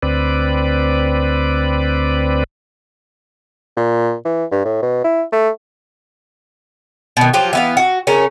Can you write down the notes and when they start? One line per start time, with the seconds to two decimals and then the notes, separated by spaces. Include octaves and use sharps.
0.03 D2 C4 B4 D5
3.77 A#2
4.25 E3
4.51 G2
4.65 A2
4.82 B2
5.04 E4
5.32 A3
7.17 B2 D#3
7.33 F3 F#3 F4 G4
7.53 E3 B3 F5
7.77 F#4
8.07 C#3 C#4 A#4